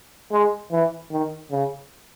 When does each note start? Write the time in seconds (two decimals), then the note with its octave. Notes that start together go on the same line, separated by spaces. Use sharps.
0.32 G#3
0.72 E3
1.11 D#3
1.51 C#3